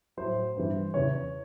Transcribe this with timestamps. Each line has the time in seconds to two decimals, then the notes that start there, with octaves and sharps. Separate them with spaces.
0.17 A2 F#3 C5
0.56 G2 E3
0.94 E2 C#3 E3 C#5